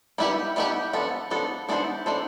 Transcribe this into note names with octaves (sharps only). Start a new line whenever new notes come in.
G3 B3 E4 G4 B4
G3 B3 E4 G4 B4
F3 B3 D4 A4
F3 B3 D4 A4
E3 B3 D4 A4 C5
E3 B3 D4 A4 C5